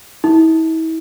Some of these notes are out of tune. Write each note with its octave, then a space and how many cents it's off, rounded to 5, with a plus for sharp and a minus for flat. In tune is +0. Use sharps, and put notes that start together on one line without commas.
E4 -40